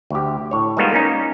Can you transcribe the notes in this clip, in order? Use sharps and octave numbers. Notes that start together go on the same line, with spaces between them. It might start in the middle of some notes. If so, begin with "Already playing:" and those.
D2 G4
A2 C#5
G3 G#3 A#3 B3 D#4 F4
A#3 C#4 D#4